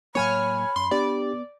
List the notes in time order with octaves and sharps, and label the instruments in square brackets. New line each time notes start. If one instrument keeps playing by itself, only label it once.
[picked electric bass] A2 F#3 A#3 [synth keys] C#5 G#5 F6 [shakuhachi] B5
[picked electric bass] F#2 [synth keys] C6
[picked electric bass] B3 [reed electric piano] D4 G4 [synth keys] D5